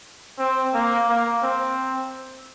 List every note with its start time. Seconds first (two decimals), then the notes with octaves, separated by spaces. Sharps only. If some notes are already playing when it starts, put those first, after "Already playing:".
0.39 C4
0.74 A#3
1.09 A#3
1.43 C4